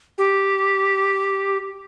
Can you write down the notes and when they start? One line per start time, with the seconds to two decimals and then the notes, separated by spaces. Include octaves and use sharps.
0.18 G4